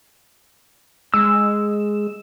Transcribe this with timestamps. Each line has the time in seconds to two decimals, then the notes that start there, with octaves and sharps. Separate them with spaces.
1.14 G#3 E6